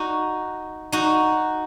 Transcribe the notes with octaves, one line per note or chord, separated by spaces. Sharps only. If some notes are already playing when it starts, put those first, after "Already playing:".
Already playing: D#4 F#4
D#4 F#4